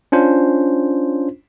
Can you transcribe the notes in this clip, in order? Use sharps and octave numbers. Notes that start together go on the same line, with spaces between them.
C#4 D4 F4 C5